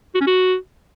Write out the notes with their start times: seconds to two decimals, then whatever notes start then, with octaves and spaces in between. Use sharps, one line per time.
0.15 F#4
0.21 C#4
0.27 F#4